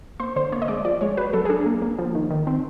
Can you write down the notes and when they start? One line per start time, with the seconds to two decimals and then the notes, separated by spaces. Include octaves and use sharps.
0.20 A#3 C5
0.36 D3 C5
0.52 A#3 C#5
0.62 D#5
0.68 G#3 D5
0.85 F3 D5
1.01 G#3 C#5
1.17 F#3 B4
1.33 F#3 A4
1.45 G#4
1.50 D4 A4
1.66 A#3
1.82 A#3
1.99 F3
2.15 D#3
2.30 D#3
2.47 C4